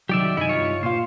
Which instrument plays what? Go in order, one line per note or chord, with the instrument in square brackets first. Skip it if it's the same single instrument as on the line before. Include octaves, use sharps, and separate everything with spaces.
[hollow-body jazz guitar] C2 D#3 F#3 [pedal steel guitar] G4 D5 E5
[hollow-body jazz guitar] C2 G2 D#4 [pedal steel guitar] E4 G#5
[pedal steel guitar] F4 C#5
[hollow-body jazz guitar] A#2 F4 [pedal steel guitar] C5